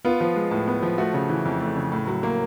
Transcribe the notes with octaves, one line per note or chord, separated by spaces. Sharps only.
B3 F4
F3
G#3
A2
B3
F3
A3 F#4
C#3
E3
F2
A3
C#3
A2
F#3
A#3